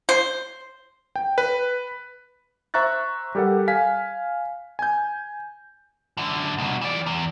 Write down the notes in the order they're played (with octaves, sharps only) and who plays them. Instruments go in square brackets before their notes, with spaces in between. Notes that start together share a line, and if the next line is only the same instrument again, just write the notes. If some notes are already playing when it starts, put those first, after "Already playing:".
[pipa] C5
[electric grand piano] G5
B4
C5 E5 A#5 C#6 F#6 A6
G3 G4 A4 A#4 F#5
F5 G#5 B6
G#5 G6
[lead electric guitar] F#2 D3
C2 B2
E3 D5
E2